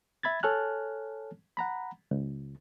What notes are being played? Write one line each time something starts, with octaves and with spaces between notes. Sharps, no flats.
E5 B5 G#6 A6
A4 C#5 G#5 A5 F6 F#6
F#5 A#5 B5
C#2